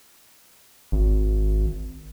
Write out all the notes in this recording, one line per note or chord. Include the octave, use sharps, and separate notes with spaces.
G#1